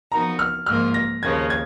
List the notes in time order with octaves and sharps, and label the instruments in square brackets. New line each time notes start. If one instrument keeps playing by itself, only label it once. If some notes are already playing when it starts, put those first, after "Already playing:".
[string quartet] F3 B3 D#4 F#4 A#4 [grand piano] A#5
[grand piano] F6
[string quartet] G#2 F3 A#3 F4 A#4 [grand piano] F6
[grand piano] A#6
[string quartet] D#2 C#3 F3 A#3 [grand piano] G#6
[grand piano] G#6